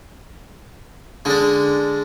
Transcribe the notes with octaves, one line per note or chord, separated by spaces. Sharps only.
D3 G#3 D4